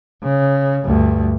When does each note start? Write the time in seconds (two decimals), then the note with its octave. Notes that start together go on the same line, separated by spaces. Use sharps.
0.23 C#3
0.85 D2 G2